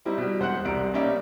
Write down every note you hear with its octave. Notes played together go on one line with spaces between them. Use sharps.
G3 C4 D#4 E4
B2 G3
E1 C5 F#5 G5 F#6 C#7
C2 C3 D5 A#5 D7
G3 A#3 C#4 D#4 D5 E5